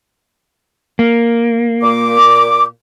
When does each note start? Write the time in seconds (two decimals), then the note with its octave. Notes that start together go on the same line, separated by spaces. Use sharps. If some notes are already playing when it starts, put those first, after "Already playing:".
0.99 A#3
1.82 A#2 D6